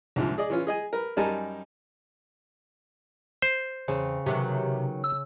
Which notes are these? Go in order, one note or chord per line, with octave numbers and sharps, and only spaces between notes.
C2 G#2 D3 F3
G#4 D5 D#5
E3 C#4 F4
G#4 D#5 G#5
A#4 B4
F#2 G3 D#4 A#4 G#5 A5
C5
E2 C#3 C4
C3 D#3 F#3 B3
E6